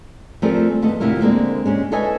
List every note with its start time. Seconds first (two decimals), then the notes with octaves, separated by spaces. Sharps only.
0.42 F3 G3 A3 C4 G#4 A#4
0.82 D#2 A3 B3 A4 D#5
1.00 D2 C3 C4 E4 F4 A#4
1.21 D3 G#3 A#3 C4
1.66 G#3 C#4 G4
1.92 A4 B4 C#5 D#5 E5 G#5